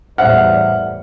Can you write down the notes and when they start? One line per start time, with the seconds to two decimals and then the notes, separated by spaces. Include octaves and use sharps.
0.18 E2 A2 G3 C5 E5 F#5 F6